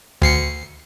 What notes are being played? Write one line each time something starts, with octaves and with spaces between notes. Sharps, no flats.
D2 C7 C#7